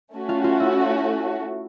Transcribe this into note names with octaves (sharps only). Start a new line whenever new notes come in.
A3 C#4 F#4
F4 F5
F4 F5
E4 E5